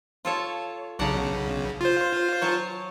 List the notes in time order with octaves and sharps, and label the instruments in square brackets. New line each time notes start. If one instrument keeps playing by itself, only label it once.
[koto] F4 A4 C#5
[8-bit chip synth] B1 C#3 [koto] D4 F#5 A#5
[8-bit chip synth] F4 C5
[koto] F#3 C#5 A5